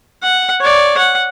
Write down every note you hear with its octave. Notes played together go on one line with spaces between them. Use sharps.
F#5
C#5 D5
F#5